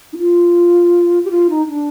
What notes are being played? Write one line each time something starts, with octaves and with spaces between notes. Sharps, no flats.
D#4
F4
G4
F4
D#4
D4